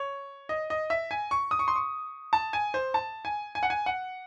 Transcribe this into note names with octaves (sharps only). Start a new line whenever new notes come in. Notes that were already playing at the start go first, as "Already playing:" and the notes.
Already playing: C#5
D#5
D#5
E5
G#5
C#6
D#6
C#6
C6
C#6
A5
G#5
C5
A5
G#5
G#5
F#5
G#5
F#5